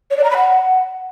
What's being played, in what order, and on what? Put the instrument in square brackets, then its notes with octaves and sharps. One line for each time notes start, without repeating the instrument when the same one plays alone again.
[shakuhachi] C#5
D5
A#5
B5
F#5